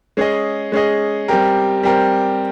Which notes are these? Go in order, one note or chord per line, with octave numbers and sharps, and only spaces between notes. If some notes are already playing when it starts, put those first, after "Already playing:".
G#3 C#4 G#4 D#5
G#3 C#4 G#4 D#5
G3 C4 G4 A#4
G3 C4 G4 A#4